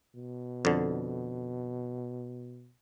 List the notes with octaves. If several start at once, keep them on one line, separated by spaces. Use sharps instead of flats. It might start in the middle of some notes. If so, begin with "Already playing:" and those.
B2
F2 D3